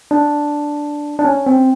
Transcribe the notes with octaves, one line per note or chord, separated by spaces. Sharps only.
D4
D4
C#4
C4